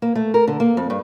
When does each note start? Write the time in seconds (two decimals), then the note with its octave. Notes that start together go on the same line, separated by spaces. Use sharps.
0.02 A#3
0.15 A3
0.34 A#4
0.48 D3
0.60 A#3
0.77 F2
0.90 G2